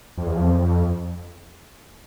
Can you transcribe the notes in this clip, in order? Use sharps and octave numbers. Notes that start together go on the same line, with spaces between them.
F2
E2
F2